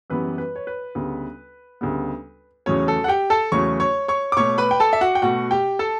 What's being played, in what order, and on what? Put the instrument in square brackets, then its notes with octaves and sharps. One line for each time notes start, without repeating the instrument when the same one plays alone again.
[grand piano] F#2 E3 G3 B3 B4
B4
C#5
B4
D2 C#3 G3 B3
D2 C#3 G3 B3
E2 C#3 F#3 A3 C#4 C#5
A4
F#5
G4 G5
A4 A5
E2 C#3 F#3 A3 C#5 C#6
C#5 C#6
C#5 C#6
D6
B2 A3 C#5 C#6
B4 B5
G5
A4 A5
E5
F#4 F#5
G5
B2 A3 F#4 F#5
G4 G5
A4 A5